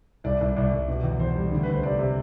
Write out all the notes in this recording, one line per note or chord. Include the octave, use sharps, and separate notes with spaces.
C2 D5
C2
C2 D5
C2
B2
E2
E2 C5
G3
D2
D2 B4
C5
C3 D5
C3